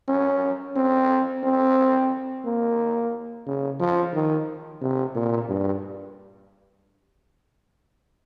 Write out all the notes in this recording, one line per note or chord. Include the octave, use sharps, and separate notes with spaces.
C#4
C4
C4
A#3
C#3
F3
D#3
C3
A#2
G2